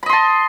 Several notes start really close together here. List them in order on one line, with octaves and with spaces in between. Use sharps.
B5 D#5 C6 A5